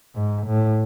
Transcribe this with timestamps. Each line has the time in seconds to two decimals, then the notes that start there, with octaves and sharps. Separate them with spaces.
0.15 G#2
0.47 A2